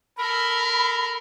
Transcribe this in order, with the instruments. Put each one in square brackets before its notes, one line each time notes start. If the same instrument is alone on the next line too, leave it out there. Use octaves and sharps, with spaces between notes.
[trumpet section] A4 A#4 [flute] B5